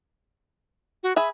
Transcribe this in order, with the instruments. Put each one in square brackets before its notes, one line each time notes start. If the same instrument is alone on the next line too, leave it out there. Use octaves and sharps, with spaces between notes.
[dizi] F#4
[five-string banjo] G#4 E5 [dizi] B5